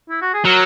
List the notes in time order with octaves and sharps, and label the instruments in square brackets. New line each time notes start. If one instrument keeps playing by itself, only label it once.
[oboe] E4
F#4
G#4
[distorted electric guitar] F#3 [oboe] A#4